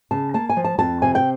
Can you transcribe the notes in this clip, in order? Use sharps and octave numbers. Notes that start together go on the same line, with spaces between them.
C#3 A5
A#3 A5
G#5
F3
A5
F2 A5
C3 G#5
G5